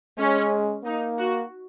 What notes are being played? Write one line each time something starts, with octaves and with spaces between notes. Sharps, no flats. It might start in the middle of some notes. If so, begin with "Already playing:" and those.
G#3 C#4
A#3 D#4
F#4